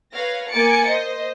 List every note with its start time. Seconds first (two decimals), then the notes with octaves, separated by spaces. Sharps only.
0.12 B4 C#5 F5 A#6
0.50 A#3 G#5 D6 A6 C#7
0.87 C5 D#5